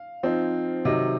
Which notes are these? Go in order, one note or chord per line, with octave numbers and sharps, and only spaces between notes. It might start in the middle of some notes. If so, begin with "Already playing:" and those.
Already playing: F5
F3 C4 D#4
C3 D#3 F#3 D#5